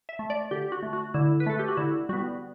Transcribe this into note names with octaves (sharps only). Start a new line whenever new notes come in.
E5
A3
D5
D3 G4
F#4
A3
F#4
D3 E4
B4
A3 A4
G4
F#4
D3 E4
G3 B3 F#4